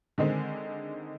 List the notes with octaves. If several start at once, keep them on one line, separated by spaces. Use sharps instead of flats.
D3 D#3 G#3 C4